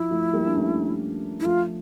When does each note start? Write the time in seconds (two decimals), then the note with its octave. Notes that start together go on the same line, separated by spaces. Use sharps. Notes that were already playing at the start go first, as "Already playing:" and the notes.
Already playing: F3 E4
0.11 F3 A3
0.33 G3 A#3
0.46 D4
0.55 A3 C#4
1.40 E4
1.44 F3 A3 F4